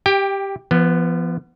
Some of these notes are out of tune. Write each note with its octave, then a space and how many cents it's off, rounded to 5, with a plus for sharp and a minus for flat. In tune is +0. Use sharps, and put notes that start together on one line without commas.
G4 +0 G5 +25
F3 -35 B3 +0